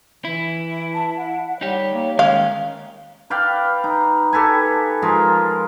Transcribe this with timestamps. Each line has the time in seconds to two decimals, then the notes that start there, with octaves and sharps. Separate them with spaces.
0.25 E3 E4
0.94 A5
1.17 F#5
1.61 G3 D#4 G4 C#5
1.94 A#3
2.19 D#3 G#3 C#4 F5
3.30 B4 D5 F5 G5
3.84 D#4
4.33 G4 A4 B4 G#5
5.02 F3 G#3 F4 A#4